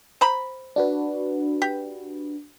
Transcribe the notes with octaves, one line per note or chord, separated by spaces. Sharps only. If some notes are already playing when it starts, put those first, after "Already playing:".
C5 A#5 B5
D4 F#4 B4
G4